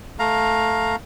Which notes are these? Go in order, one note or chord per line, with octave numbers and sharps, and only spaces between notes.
A3 F5 A#5